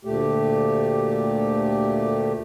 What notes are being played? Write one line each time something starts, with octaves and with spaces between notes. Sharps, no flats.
D2 A#2 A3 G4